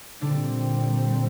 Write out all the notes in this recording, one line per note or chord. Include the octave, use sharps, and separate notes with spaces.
A#2 D3 G3 C4 D4